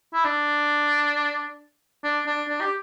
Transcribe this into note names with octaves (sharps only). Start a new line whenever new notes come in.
E4
D4
D4
D4
D4
G4